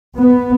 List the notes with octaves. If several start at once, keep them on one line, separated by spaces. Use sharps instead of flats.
B3